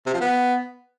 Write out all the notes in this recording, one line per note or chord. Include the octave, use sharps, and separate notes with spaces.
C3
F3
B3